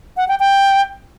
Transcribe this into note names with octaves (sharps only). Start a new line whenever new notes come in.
F#5
G5
G5